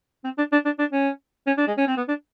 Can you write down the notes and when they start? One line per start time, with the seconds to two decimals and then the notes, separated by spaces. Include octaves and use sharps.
0.24 C4
0.38 D4
0.52 D4
0.65 D4
0.79 D4
0.92 C#4
1.47 C#4
1.57 D4
1.67 G#3
1.77 C#4
1.87 C4
1.97 B3
2.08 D4